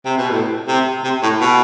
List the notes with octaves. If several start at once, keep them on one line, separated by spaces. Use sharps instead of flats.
C3
B2
A2
C3
C3
A2
B2